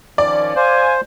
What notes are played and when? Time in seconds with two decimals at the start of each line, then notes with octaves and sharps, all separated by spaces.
0.18 D#3 F3 C#4 D5
0.56 C5 F5 G#5